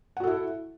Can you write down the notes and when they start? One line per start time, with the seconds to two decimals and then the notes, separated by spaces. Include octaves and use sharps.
0.17 F#5
0.20 F#4
0.24 A4
0.27 E4